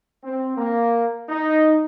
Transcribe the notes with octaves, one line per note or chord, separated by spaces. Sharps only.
C4
A#3
D#4